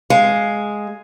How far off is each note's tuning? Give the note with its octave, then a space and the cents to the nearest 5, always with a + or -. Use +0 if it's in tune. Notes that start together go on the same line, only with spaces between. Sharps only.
G#3 +0 F5 +0